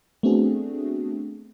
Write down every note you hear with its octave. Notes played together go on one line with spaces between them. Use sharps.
A3 B3 C4 D4 F#4 G#4